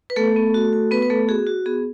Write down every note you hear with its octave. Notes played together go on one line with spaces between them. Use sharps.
B4
A3 B3 A4
B3
F#4
F#4
B3 B4
B4
A3 B3 A4
F#4 G#4
F#4
B3 G#4